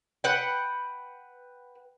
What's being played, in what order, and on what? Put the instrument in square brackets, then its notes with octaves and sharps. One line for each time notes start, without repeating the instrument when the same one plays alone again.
[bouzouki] B4 F#5 G5